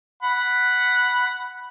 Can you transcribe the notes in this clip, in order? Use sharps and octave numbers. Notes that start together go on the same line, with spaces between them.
F#5 B5